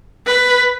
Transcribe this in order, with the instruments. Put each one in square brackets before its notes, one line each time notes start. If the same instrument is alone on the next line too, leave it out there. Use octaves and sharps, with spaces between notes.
[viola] B4